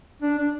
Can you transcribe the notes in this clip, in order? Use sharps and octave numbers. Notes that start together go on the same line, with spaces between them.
D4
D4